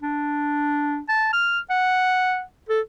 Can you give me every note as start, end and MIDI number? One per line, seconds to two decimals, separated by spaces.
0.03 1.00 62
1.09 1.31 81
1.33 1.60 89
1.70 2.42 78
2.69 2.80 69